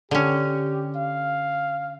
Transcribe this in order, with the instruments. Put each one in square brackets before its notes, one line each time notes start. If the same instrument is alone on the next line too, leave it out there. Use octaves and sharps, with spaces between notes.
[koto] D3 C#4 [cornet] G4
[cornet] F5